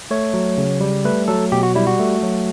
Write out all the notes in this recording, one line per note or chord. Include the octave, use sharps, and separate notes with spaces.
A3 C#5
F#3
C#3
G3
A3 B4
F#3 A4
B2 G4
F#4
G3 E4
F#4
A3
F#3